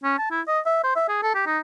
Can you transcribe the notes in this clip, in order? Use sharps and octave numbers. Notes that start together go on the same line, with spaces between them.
C#4
A5
E4
D#5
E5
C5
E5
G#4
A4
G4
D#4